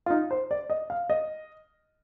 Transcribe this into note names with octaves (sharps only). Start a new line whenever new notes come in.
F4
D#4
C5
D5
D#5
F5
D#5